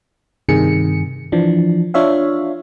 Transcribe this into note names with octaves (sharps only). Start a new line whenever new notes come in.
G2 C3 D#3 G#4 C#7
E3 F3 D4
D4 F4 C#5 E5 F5